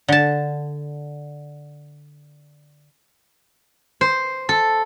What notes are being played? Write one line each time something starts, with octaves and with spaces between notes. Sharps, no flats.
D3 A5
C5
A4